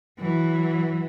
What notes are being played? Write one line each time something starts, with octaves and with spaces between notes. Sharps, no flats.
E3 F#3